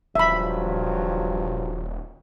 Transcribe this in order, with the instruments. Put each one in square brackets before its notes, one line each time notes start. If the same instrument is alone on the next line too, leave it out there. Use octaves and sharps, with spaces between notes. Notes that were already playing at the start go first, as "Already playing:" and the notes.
[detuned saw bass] D#1 [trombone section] G2 F3 F#3 [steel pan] E5 B5